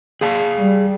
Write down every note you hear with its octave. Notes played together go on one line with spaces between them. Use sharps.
G#4 F5 A5
G3